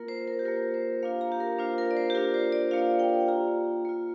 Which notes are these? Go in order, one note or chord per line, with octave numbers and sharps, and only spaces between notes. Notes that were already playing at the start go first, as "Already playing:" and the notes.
Already playing: A#3 F4 A#4
C5
A#4
G4
A#3 F4 A#4
C5
A#3 D4 F4 F5
A#5
G4
A#4
A#3 D4 F4 C5
A#4
D5
C5
G4
A#3 D4 F4 A#4
C5
D5
A#3 D4 F4 F5
G5
A#3 F4 A#5
A#3 F4